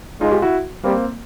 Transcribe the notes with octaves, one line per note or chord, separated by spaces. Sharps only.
G#3 D#4 F4
F4 G4
E4 F#4
G3 A#3 C4